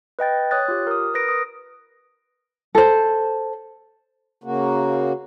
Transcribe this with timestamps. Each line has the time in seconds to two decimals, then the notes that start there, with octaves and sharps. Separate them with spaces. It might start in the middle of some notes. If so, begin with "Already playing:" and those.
0.19 B4 D#5 G5 A6
0.51 C#5 D#6 F#6 A6
0.68 F4 G4
0.87 A#4 D#6
1.14 A#4 B4 A#6 D7
1.29 D#6
2.75 A4 C5
4.44 C#3 A#3 F#4